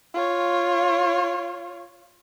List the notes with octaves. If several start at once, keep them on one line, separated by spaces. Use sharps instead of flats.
F4 C#5